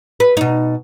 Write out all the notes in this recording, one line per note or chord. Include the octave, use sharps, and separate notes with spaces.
B4
B2 D#4